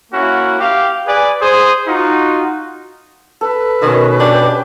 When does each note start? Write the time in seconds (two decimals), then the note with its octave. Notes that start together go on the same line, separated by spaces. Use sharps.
0.12 A#3 C#4 E4 F#4
0.59 G4 F5
1.07 G#4 B4 D5 G#5
1.41 G#4 C5 D#6
1.87 D#4 F4 F#4
3.41 A4 B4
3.82 B2 D#3 C#4 D#6
4.20 D4 G4